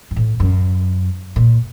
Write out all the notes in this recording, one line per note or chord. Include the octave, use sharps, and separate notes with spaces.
F#2
A2
F#2
A#2